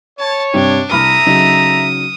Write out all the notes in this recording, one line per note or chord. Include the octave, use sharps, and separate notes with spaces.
C#5 A5
G2 C3 G3 D4
C2 A3 E5 A#5 B5 D#6 F6
C#3 F#3 D#4